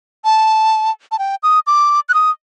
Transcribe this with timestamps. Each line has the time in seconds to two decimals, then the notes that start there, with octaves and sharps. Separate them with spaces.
0.25 A5
1.12 A5
1.19 G5
1.43 D#6
1.67 D6
2.09 F#6
2.14 D#6